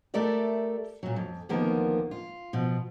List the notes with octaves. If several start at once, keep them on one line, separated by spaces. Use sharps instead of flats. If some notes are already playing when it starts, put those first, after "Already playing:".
A3 G4 A4 A#4 D5 E5
A#2 F#3
F2
D2 D#3 F3 A#3 B3 A#4
F4
B2 F3